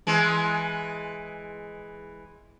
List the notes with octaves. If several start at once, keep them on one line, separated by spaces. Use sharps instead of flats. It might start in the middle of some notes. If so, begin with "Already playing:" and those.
E3 G#3